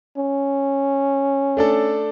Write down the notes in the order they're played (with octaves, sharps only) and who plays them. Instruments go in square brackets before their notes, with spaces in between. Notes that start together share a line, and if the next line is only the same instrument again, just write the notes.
[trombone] C#4
[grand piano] A3 D4 A4